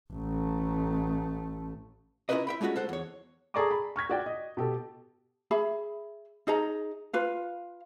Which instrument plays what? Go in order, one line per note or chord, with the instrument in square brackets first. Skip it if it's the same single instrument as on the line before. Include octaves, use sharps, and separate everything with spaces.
[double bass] A1 A3
[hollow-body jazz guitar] C#4 E4 F4 A#4 B4 D#5
E5 G5 B5
G#3 A3 C#4 F4 F#4
A4 C5 F#5
E2 C#5
[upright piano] G#4 A4 D5 A#5 C#6 D6
B5
C#6 F6 G#6 B6
F#4 D5 G5
D#5
B2 G4 A4
[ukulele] G#4 E5 B5
D#4 G#4 D#5 A#5
F4 B4 F5